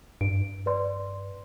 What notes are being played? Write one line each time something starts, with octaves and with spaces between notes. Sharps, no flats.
G2 D7
B4 D5 C6